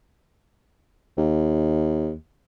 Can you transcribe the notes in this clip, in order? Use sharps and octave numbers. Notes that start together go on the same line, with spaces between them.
D#2